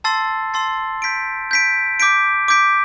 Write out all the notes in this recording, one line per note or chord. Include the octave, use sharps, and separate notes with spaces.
A5 C6 E6 A6 C7
A5 C6 E6 A6 C7
G6 B6 D7
G6 B6 D7
D6 G6 B6 D7
D6 G6 B6 D7